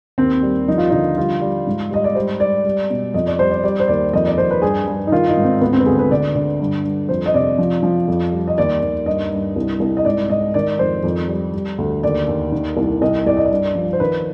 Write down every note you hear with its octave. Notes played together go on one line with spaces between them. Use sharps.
D#2 C4
G3
F3 D#4
F4
D3 D#4
G3 F4
G3
G#2
G3 D#5
D5
G3 C5
G3 D5
G3
B2
F2 D#5
D5
G3 C5
D5
G3 D5
C5
D#2 D5
F2 D#5
D5
F2 C5
B4
G2 G#4
G2
D#4
D#3 F4
D#4
G#2
C4
D2 B3
C4
B4
D2 G#4
B4
D3 D5
D3
G2
G2
F2 C5
D#5
C3 D5
F3
F3
F2
G3
D#5
D#2 D5
D#2
G2 D#5
G2
C2
C2
D#5
G#2 D5
G#2 D#5
D#3 D5
F2 C5
F2
G3
G3
D2
D#2 D5
D#2
D#3
C2
C2 D#5
C2 D5
D#5
D5
G2
F3
C5
D#3 B4